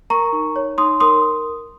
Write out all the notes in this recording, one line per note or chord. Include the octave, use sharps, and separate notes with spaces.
A#4 A#5 C#6
D#4
C#5
D#4 C6 D#6
A#4 C6 D#6